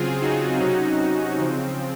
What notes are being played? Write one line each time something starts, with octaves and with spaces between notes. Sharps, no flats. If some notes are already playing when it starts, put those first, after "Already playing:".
Already playing: C#3 F#3 C4 F4 G#4
D#4 F#4
C3 F#3 C#4 D#4 F#4
C#3 F3 C4